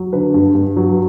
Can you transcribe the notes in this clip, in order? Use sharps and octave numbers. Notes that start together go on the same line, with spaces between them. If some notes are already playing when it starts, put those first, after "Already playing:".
Already playing: F#3
D3 B4
G2
G2
F#3